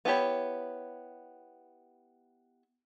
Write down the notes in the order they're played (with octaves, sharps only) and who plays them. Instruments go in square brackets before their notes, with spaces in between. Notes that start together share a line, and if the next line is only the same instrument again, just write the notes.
[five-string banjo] B3 E4 G4 C#5